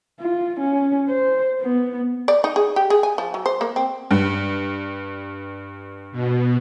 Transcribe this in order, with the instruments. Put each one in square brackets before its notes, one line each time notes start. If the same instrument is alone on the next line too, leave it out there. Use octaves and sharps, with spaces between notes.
[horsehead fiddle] F4
C#4
C5
B3
[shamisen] D5
D#4
G#4
G4
G#4
G#5
F3
F#3
C5
A#3
C4
[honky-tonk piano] G2
[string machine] B2